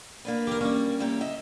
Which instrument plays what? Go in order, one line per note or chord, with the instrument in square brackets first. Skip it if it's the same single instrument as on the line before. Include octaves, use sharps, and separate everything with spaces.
[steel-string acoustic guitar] A#3 D4 B4
[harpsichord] G4 A#4
[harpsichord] G3 C#4 [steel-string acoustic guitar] A#3
[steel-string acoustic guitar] E2 A#3 G4
D#5 E5